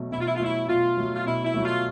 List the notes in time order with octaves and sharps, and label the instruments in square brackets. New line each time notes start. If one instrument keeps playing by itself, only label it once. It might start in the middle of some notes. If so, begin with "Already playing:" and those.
Already playing: [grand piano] B2 F#3 A3
[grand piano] B2 [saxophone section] E4
[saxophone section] F4
E4
F4
[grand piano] F#3 A3 [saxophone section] E4
[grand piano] B2 [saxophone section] F4
[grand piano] F#3 A3
[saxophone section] F4
[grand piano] B2 [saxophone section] E4
[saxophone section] E4
[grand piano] F#3 A3
[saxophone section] F4